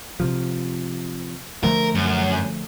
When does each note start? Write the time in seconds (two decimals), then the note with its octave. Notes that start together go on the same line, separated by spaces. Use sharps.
0.20 C3 F3
1.63 D3 F3 A3 A#4
1.95 F#2